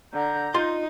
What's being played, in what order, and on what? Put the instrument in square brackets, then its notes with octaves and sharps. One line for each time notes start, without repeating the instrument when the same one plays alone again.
[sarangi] D3 [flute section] A#5 G6
[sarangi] D#4 [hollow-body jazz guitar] F4 C6